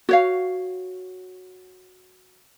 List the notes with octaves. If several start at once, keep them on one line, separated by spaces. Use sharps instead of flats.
F#4 C#5 F5